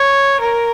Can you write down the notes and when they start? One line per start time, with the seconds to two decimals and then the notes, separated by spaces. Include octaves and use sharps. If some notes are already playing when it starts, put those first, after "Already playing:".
Already playing: C#5
0.40 A#4